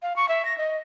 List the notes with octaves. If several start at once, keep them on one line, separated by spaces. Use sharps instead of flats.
F5
C#6
E5
A#6
D#5